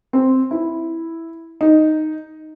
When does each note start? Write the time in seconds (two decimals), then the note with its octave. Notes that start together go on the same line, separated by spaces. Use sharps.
0.13 C4
0.51 E4
1.61 D#4